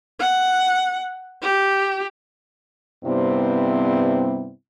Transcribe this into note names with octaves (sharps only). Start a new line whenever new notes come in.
F#5
G4
G2 C3 G3 B3 C4 E4